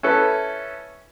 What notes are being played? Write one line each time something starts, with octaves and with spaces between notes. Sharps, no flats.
C#4 E4 A4 B4